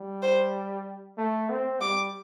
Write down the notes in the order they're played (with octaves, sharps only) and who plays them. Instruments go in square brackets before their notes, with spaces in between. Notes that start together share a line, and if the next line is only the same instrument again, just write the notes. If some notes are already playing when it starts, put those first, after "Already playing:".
Already playing: [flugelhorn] G3
[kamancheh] C5
[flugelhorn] A3
C4
[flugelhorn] G3 [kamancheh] D6